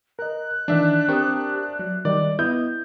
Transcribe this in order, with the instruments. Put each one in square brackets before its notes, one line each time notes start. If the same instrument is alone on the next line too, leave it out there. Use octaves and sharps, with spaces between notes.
[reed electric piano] A#4 D#5 [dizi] F#6
[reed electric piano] D#3 E3 [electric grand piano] D4 E5
[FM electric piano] C4 G4 A#4 [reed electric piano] C#6 D#6
[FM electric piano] F#3
[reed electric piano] D#3 G3 D#4 [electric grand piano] D5
[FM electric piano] B3 D#5 [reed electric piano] E4 [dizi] D#6 [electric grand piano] G6